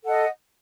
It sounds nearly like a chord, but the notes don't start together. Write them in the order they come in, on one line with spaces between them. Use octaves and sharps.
A4 F#5 D#5